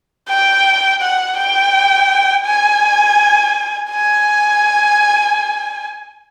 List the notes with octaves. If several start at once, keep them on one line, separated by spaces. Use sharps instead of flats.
G5
F#5
G5
G#5
G#5